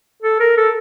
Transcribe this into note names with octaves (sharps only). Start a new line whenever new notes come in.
A4
A#4
A4